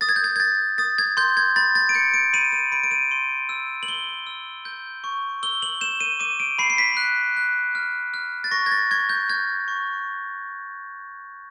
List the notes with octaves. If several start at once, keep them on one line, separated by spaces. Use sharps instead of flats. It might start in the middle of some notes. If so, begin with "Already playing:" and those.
D#6 A6
G#6
G6
G#6
G#6
G6 A6
D#6 A6
G#6
C6 G6
G#6
B5 A6
A6
D7
G6 C#7
D7
B5 D#7
D#7
B5 D7
D7
D#7
C6
E6
F#7
C6 G7
E6
G6
C#6
E6 G7
F#7
G6 E7
D#7
D6 D#7
D7
B5 C7
C7
B6
F#6
F#6
F6
F6
A6
C#6 A#6
G#6
A6
C#6 G#6
G6
F6 G#6
C#6